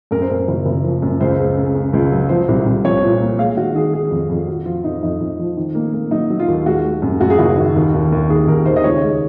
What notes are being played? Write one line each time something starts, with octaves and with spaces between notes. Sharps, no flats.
F#2 A#4
C5
F#2 A#4
F#1
F#1
F3
F#2
C#2 C5
C#3
C#3
C#3
C#2
F#3
F3 C5
C2
C2
F3 C#5
A#2
A#3
G#3 F5
D#3 F#4
D#3 G#4
D#3 G#4
F2
F2
F3 F#4
F3 F4
F2 D#4
F2 D#4
F2
F3
D#3
A#3
A#3
F#3 D#4
F#3
F4
D#2
G#3 F#4
G#3
F#2
F#2 F#4
G#4
F#1 F#4
D#3
D#2
D#2
D#2
D#2 G#4
D#2 A#4
D#3 C5
D#5
C#2 C#5
G#3